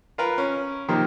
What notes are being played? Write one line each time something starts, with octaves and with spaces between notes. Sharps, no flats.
F4 A#4 B4
C#4
C3 D#3 F3 A#3